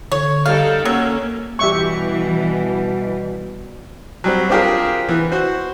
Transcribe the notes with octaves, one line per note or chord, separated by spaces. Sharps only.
D3 C#5
G3 D#4 A4 F5
F#3 A#3 C#4 E6
B2 E3 G3 G4 E5 C#6
F#3 G3 C4
C4 D4 F4 G4 G#4 A#4
E3 B3
F#4 C5